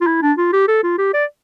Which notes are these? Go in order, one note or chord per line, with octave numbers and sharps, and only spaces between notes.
F4
E4
D4
F4
G4
A4
F4
G4
D5